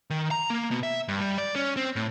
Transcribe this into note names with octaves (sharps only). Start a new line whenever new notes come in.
D#3
A#5
A#3
B2
E5
G2
G3
D5
C#4
C4
A2